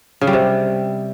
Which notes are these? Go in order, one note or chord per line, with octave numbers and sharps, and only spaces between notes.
C#3
G3
C3